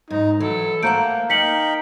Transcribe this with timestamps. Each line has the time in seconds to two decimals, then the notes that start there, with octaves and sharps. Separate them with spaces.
0.10 G#2 D#4
0.40 E3 F#3 A4
0.83 A3 A#3 A4 C5 F#5 A#5 G6 D7
1.30 D#4 A#4 F5 G5 B6 C#7 F#7